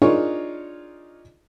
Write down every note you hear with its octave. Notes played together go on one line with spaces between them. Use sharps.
D4 D#4 F4 G#4 A#4 C#5